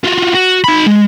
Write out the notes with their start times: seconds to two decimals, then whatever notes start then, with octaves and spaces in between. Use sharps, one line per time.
0.05 F4 F#4
0.35 F#4
0.64 D#4 B5
0.86 G#3